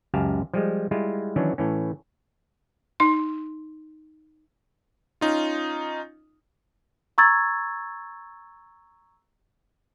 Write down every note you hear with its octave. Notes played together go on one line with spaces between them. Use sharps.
C#2 F#2 G4 F5 G#5 A5
F3 G3 G#3
G3 G#3 E4 F4
D#3 E3 F#3 C#4 D4
A2 E3 C#4
D#4 C6
C#4 D#4 F4
A#5 C#6 E6 G#6 A6